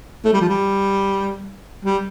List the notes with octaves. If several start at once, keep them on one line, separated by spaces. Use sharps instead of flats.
A3
G3
F3
G3
G3